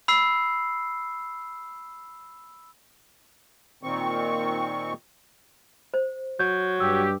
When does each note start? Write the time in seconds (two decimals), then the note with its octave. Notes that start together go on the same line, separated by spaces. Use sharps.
0.08 B5 E6 C7
3.83 A#2 D#3 C4 C#6
5.94 C5
6.39 F#3 G6
6.80 G2 G4 E6